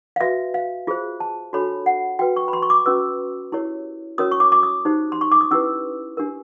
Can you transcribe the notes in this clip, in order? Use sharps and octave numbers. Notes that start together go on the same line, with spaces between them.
F5
F#4 B4 E5
F5
F4 G#4 C5
A5
D4 F#4 A4 C#5 B5
F#5
F#4 B4 G5
C#6
B5
C6
C#6
D6
C#4 F#4 B4 E6
E4 G4 A#4 C#5
C#4 F#4 A#4 C#5 D#6
C#6
D6
D6
D#6
D#4 G4 C5
C6
C#6
D6
D#6
C#4 E4 G4 B4 E6
D4 G4 A#4